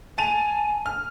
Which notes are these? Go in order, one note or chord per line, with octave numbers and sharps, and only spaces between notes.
G#5 A5 D#7 F7
F6